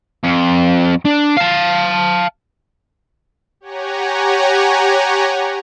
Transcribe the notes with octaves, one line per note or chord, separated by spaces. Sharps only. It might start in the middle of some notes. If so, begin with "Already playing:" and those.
F2
D4
F5 A5
G4 C#5 F#5 G#5 A#5